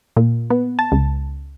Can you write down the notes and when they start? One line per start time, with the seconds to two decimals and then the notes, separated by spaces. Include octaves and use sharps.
0.17 A#2
0.50 B3
0.79 A5
0.92 C#2